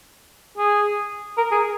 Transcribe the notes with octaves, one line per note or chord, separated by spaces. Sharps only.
G#4
A#4
G#4